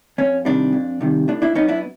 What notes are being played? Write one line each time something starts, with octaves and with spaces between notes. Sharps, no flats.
F2 C#4
C3 D#3 G3 D4
F2
C3 D#3 G3
A2 D4
D4 E4
F#3 B3 C#4 D#4
D4 E4